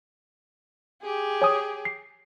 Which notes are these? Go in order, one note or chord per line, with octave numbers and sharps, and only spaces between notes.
G4 G#4
C#5 G#5 D#6
C7